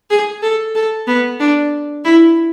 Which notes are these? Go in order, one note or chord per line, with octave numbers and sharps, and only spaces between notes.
G#4
A4
A4
B3
D4
E4